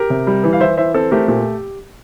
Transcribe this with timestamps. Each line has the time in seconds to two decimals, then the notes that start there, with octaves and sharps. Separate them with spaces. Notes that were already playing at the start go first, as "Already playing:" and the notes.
Already playing: G4 A#4
0.10 C3
0.27 G3
0.44 E3
0.53 F5
0.60 E3 C5 E5
0.77 E3 C5 E5
0.94 C4 A4
1.11 A3 G4 A#4
1.28 A#2 G4